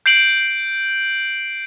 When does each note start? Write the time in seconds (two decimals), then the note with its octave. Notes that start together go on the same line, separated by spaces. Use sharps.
0.06 G6 C7 D7 F#7